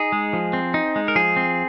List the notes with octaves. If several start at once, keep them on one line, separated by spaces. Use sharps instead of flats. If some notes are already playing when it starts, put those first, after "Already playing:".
Already playing: D#4 G#4
G#3
F3
C4
D#4
G#3
A#4
F3 G#4
C4